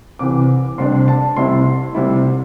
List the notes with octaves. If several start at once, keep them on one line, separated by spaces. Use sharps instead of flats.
C2 C3 E3 D6
C2 C3 G3 D4 C6
A5
C2 C3 G3 E4 C6
C2 C3 G3 E4